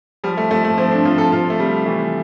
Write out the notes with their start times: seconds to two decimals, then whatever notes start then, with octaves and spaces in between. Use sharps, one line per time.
0.24 F3 G3
0.37 A3
0.51 F3 A3
0.64 A3
0.78 F3 C4
0.91 D4
1.05 F3 F4
1.18 A4
1.32 C3 F4
1.50 A3
1.59 C3 G3
1.86 E3 A3